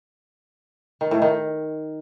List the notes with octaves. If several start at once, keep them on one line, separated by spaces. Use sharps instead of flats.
D#3
A2
D#3